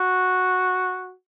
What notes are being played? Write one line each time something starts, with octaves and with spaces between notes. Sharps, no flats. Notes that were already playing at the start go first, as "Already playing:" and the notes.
Already playing: F#4